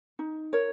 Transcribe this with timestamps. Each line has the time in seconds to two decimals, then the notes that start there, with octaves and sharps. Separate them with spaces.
0.19 D#4
0.53 A#4 C#5